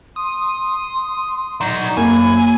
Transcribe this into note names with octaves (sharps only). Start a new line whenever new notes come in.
C6 D#6
F#3 D#4 D5
F#2 A#3 G#5 B5